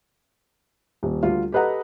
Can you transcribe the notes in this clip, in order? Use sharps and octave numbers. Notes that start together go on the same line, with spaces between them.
D#1
D2 G3 F4
G4 A4 B4 D#5 F#5 A#5